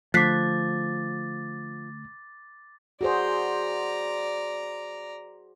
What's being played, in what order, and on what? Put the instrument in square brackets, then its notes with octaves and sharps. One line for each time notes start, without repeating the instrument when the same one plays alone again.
[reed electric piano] D3 A3 [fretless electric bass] F3 [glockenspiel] D6 A6 [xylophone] F#6 B6 C7
[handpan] F#4 G#4 C5 [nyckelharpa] D5 A#5